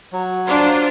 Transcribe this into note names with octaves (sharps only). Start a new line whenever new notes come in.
F#3
D4 F4 C5